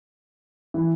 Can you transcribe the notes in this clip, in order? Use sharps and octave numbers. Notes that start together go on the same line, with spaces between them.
E3